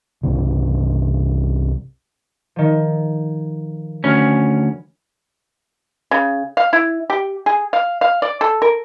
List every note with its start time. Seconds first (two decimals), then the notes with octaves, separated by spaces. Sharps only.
0.23 C2 G2 C#3
2.56 D#3 F3
4.04 D2 C#4 G#5 B5 F6
6.11 C#3
6.57 F5
6.73 E4
7.10 G4
7.46 G#4
7.73 F5
8.01 F5
8.22 D5
8.41 A4
8.62 A#4